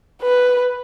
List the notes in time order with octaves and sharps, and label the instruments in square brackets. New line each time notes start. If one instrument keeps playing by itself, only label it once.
[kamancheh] B4